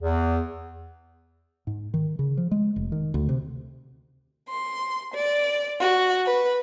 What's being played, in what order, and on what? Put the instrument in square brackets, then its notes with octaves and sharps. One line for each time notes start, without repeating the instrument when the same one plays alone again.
[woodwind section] E2
[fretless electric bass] G#2
D#3
C#3
F3
G#3
F1
D#3
D2
C3
[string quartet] C6
D5
F#4
B4